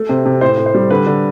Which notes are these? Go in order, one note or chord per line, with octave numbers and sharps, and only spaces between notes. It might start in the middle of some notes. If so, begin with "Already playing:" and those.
Already playing: A3
C3
C3
A2 C5
A2
C5
G3
D3 B4
D3